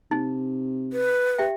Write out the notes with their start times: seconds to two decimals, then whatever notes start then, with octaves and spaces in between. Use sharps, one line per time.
0.11 C3 D#4
0.93 B4
1.38 G4 E5 G5